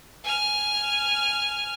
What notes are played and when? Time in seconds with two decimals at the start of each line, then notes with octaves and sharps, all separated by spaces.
0.24 G#5 F6